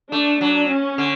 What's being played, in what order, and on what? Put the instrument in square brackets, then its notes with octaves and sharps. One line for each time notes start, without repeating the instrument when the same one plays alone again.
[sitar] A3 [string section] D4
[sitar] F#3 [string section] D4
[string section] C#4
[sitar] D3